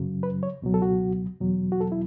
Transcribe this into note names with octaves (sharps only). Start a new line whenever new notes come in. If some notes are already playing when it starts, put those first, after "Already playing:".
Already playing: F#2 C#3 F#3
B4
C#5
C#2 B2 F#3
A4
F#4
E2 B2 F#3
F#4
A4
E4